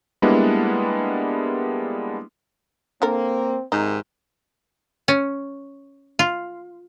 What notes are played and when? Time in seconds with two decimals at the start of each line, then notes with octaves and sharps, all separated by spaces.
0.22 G3 G#3 A#3 B3 D4 E4
3.02 D3 A#3 C4 A4 A#4
3.72 G#2 C3 D#3 D#4
5.08 C#4
6.19 F4